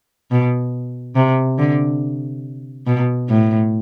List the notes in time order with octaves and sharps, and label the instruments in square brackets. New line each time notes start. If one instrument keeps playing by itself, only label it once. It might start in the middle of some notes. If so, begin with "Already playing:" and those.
[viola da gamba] B2
C3
D3
B2
A2